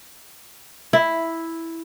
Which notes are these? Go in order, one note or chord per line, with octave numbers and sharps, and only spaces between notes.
E4